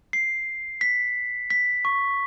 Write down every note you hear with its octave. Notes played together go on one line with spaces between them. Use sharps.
C7
B6
B6
C#6